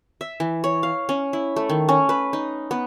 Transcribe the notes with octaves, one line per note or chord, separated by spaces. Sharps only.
E5
E3
C#5
F5
C#4
E4
A3
D#3
C#4
B4
D#4
B3